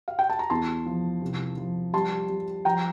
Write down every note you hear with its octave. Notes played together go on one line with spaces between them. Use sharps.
F5
G5
A5
A#5
E2 A5 C6
F3
C2
F3
G3 A5 C6
G3
F3 G5 A#5